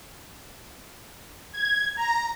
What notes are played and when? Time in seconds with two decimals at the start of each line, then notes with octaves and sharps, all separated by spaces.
1.52 G#6
1.95 A#5